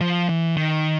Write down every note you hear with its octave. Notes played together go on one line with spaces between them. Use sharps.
F3
E3
D#3